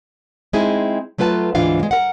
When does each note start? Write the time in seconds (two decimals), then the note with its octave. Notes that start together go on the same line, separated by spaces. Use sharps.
0.53 G#3 C4 D#4 E4 G#4
1.18 F#3 A3 F4 B4 F#5 A5
1.55 D2 G#2 E3 D4 F4 F5
1.80 G#3 A#3
1.91 A#4 F#5